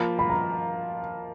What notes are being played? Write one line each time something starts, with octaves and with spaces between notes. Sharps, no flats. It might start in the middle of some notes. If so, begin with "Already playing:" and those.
Already playing: F3 A#3 F4 B5
B5
A#5